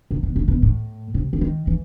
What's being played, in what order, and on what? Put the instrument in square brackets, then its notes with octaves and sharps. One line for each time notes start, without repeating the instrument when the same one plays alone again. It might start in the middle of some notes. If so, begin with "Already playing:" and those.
[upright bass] C3
B2
A2
B2
A2
C3
E3
D#3
E3